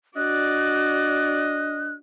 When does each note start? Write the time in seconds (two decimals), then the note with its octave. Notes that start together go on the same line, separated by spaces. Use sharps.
0.17 D4 F#4 D5 D#5 F#6